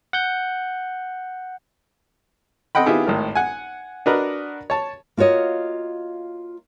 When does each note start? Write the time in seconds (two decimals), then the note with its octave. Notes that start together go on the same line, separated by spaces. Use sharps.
0.13 F#5 G6
2.75 C4 A4 D#5 F#5 G5 B5
2.86 D#3 B3 E4 F4 G4 G#4
3.06 G#1 A2 A#4
3.35 F#5 G#5
4.06 D4 F#4 A#4 B4 D#5 A#5
4.70 C#5 A5
5.17 A#3 F4 F#4 C#5 D#5